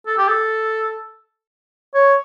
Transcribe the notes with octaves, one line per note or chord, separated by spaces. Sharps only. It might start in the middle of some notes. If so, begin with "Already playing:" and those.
A4
G4
A4
C#5